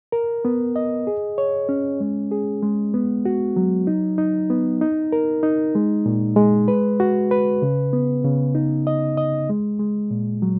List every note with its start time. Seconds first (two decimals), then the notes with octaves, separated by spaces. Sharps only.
0.12 A#4
0.45 B3
0.76 D#5
1.07 G#4
1.38 C#5
1.69 C#4
2.00 G#3
2.32 G#4
2.62 G#3
2.94 B3
3.25 F#4
3.56 F#3
3.87 D#4
4.18 D#4
4.50 B3
4.81 D#4
5.12 A#4
5.43 D#4
5.75 G#3
6.06 A#2
6.36 G#3
6.68 B4
7.00 F#4
7.31 B4
7.62 C#3
7.93 B3
8.24 C#3
8.55 D#4
8.87 D#5
9.17 D#5
9.50 G#3
9.80 G#3
10.11 A#2
10.42 F#3